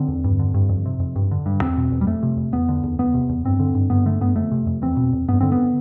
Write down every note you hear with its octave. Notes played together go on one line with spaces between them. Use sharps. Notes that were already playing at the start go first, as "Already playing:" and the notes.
Already playing: D3 C4
E2
G2
D3
G2
F2
C3
F2
G2
D3
G2
E2 C4
B2
E2
G3
F2 A3
C3
F2
E2 B3
D3
E2
E2 B3
C3
E2
G2 C4
D3
G2
G2 B3
D3 A3
G2 B3
F2 A3
C3
F2
E2 C4
B2
E2
G2 B3
D3 C4
B3